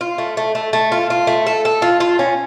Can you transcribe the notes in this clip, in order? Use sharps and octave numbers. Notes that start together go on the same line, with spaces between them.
F4
A3
A3
A3
A3
F4
F4
A3
A4
A4
F4
F4
C#4